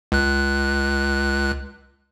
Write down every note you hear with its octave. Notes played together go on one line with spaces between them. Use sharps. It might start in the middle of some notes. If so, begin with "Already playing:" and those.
C#2 F#6